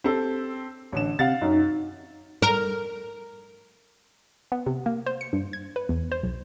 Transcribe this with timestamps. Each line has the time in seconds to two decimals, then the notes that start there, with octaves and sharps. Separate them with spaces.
0.04 C4 G4 A4
0.92 A1 D3 E7
1.19 C3 F5 F#5 A6
1.41 F#2 D#4
2.42 A#4
4.52 B3
4.66 C3
4.86 A#3
5.06 C5
5.21 C#7
5.33 G2
5.53 G#6
5.76 B4
5.89 E2
6.12 C5
6.23 B1